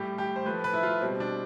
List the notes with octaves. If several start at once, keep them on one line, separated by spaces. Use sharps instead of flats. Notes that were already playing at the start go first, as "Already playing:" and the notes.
Already playing: A2 G3 G4
G4
C5
A2 F3 A3 B4
B4
E4
F4
B2 G3 C4
D4